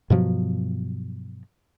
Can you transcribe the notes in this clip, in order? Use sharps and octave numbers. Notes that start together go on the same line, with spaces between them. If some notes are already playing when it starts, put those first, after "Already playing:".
G2 B2 F3 F#3